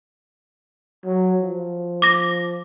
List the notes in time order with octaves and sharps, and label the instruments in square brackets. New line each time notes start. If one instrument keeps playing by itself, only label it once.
[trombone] F#3
F3
[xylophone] D6 A#6